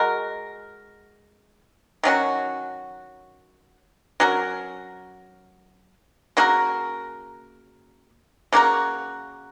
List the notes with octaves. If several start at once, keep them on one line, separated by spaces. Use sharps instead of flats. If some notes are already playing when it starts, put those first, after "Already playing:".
Already playing: G#3 F#4 A#4
D#3 F#3 C#4 F#4
F#3 C#4 F#4 A#4
C#3 A#3 F#4 A#4
C#3 A#3 F#4 A#4